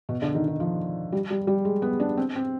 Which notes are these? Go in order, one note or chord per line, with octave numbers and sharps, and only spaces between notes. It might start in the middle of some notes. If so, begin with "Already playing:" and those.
B2
D3
D#3
D#3
F3
G3
G3
G3
G#3
B3
D4
C4
C4